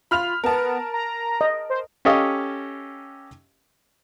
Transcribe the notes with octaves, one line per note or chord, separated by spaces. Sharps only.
F4 B5 F6 F7
B3 A#4 A5
A#5
D#5
C5
C#4 G4 A4 D#5 F5